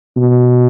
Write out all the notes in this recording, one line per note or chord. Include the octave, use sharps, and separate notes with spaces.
B2